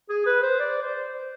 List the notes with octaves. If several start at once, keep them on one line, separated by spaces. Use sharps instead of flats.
G#4
B4
C5
D5
C5